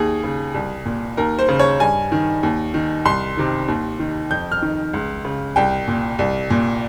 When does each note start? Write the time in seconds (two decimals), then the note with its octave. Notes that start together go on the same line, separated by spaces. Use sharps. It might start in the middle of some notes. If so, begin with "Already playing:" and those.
Already playing: D#2 G#4
0.24 C#3
0.54 C2
0.86 A#2
1.17 D#2 A#4
1.39 C5
1.49 C#3
1.60 C#5
1.80 G2 G#5
2.12 D#3
2.43 D#2
2.74 D#3
3.05 C2 C6
3.37 C3 D#3
3.68 D#2
4.00 D#3
4.30 F2 G6
4.52 F6
4.62 D#3
4.94 C#2
5.25 C#3
5.56 C2 G5
5.88 A#2
6.19 C2
6.50 A#2